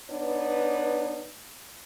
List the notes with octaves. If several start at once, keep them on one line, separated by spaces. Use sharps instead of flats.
B3 D4 D#4 B4 C#5